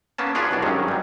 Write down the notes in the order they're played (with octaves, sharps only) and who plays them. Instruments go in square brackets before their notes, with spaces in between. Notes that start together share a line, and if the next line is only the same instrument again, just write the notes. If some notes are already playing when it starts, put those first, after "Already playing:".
[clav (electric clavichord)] A#3 B3 C#4 A5
D4 F4 F#4 G#4 B4 C#5
C2 B2 D4
G#1 G2 D#3 F#3 C#4
F#3 G3